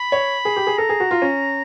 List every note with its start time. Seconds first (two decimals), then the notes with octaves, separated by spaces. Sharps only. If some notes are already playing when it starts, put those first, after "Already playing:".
Already playing: B5
0.12 C#5
0.45 G#4
0.56 G4
0.67 G#4
0.78 A4 A#5
0.89 G#4
1.00 F#4
1.11 F4
1.22 C#4